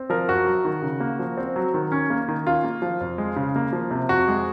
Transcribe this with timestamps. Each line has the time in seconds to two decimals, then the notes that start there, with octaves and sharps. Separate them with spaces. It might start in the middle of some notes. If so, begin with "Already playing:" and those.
Already playing: C4
0.10 F3 A#4
0.29 F#2 F#4
0.47 F#3
0.65 D#3
0.82 C#3
1.00 A#3
1.19 F3
1.38 C4
1.56 F#3
1.74 D#3
1.92 C#4
2.10 A#3
2.28 D#3
2.46 C#4 F4
2.64 A#3
2.82 F3
3.01 F2
3.18 G#3
3.36 C#3
3.56 A#3
3.73 F3
3.91 C3
4.09 F2 F#4
4.28 G#3